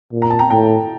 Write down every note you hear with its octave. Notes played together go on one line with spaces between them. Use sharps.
A#2
A#5
A5
G5 A#5
A2 G5 A#5